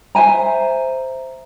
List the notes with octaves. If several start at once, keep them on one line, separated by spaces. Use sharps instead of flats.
C5 E5 G#5 A#5